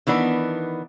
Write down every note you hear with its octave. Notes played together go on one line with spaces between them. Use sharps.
D#3 E3 B3 D4